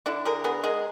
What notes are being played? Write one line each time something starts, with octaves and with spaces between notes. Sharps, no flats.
D3 D4 E4
D3 G#4 A#4
B3 G#4 A#4
G#3 G#4 A#4